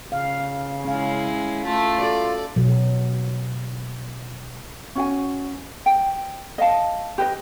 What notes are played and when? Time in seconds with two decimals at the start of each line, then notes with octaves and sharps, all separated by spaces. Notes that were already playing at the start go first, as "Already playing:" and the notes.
0.12 C#3 F5
0.85 G#3 C#4 E4 F5
1.65 A3 F4 A4
2.00 F#4 A4 D5
2.56 B2 F#3
4.95 C#4 F#4 G#5
5.86 G5
6.58 D#5 F5 A5
7.18 G4 B4 D#5